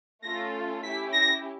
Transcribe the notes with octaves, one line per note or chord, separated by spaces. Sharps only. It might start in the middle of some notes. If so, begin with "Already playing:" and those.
A3 C#4 F4 A4 A#6
C#4 E4 G4 B6
A#6